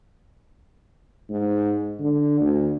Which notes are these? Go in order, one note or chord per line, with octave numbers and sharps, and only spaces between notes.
G#2
D3
D2